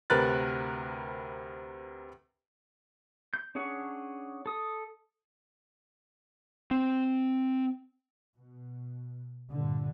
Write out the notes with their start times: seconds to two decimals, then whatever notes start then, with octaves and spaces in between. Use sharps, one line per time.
0.10 D2 C3 A#4 B4 F#6 A6
3.34 G6
3.55 C#4 D4 G#4 C#5 F#5
4.46 A4 D#6
6.71 C4
8.37 B2
9.52 G2 A#2 D3